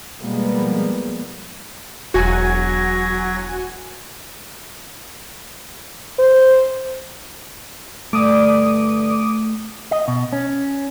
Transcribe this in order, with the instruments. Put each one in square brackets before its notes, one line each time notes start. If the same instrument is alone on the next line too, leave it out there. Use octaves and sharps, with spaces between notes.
[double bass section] B2 F3 G3 G#3 A#3 B3
[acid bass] E1 [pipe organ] F#3 G#6 A#6 [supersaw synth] F#4 G#5
[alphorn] C5
[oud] G2 D3 [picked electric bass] A3 [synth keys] D6 D#6
[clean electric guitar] D#5
B2
C#4